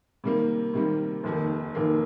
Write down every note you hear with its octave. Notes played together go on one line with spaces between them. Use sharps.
C3 D#3 G3 A#3
C3 D#3 G3 A#3
F1 D#2 D#3 A#3
F1 D#2 D#3 A#3